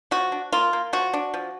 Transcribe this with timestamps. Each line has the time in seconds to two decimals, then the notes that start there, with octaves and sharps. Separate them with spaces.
0.11 F3 F#4
0.32 D4
0.52 A#3 F4
0.73 A#3
0.93 F3 F#4
1.13 D4
1.34 F3